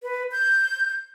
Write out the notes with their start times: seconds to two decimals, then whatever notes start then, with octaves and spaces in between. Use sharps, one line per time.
0.03 B4
0.32 G6